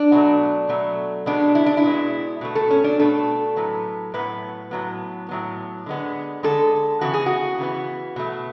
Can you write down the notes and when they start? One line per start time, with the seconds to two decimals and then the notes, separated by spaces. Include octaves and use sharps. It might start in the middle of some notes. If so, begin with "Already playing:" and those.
Already playing: D4
0.12 B2 F#3 A3
0.69 B2 F#3 A3
1.26 B2 G#3 B3 D4
1.55 E4
1.66 D4
1.77 E4
1.84 B2 G#3 B3
2.41 B2 A3
2.55 A4
2.70 C#4
2.84 D4
2.99 B2 A3 A4
3.56 A2 F#3 B3
4.14 A2 F#3 B3 B4
4.71 A2 F#3 B3
5.29 A2 F#3 B3
5.86 D3 G#3 B3
6.43 D3 G#3 B3 A4
7.01 C#3 E3 B3 F#4
7.14 G#4
7.26 F#4
7.58 C#3 E3 B3
8.16 B2 A3